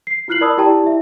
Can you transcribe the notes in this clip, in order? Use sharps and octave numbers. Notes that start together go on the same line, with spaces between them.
C7
E4 F4 F6 F#6 C7 F#7
A#4 D5 A5 B5 D#6 E6
E4 G4 D5 G5 A5 A#5
E4 E5